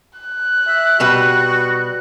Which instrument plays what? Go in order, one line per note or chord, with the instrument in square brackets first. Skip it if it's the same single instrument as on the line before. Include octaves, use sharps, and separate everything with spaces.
[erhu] F#6
[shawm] E5
[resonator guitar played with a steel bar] B2 G3 B4 [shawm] F#4